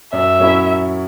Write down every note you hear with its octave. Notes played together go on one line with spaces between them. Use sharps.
F#2 E5
F#3 C#4 E4